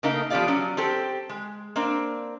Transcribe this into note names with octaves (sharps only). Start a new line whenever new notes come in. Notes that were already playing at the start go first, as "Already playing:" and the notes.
C#3 A3 A#3 D#4 A#4
F3 B3 F#4 G4 D5 F5
F#3 C#4
C4 G4 A4
G#3
A#3 C4 D4